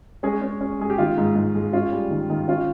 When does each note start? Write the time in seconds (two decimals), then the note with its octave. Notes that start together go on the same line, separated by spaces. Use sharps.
0.23 G#3 C#4 G#4
0.42 C#4
0.61 C#4
0.79 G#3 G#4
0.90 G4
0.98 D#3 F4
1.18 G#2
1.35 G#2
1.55 G#3
1.73 C#4 F4
1.92 G3
2.10 D#3
2.30 D#3
2.48 C#4 F4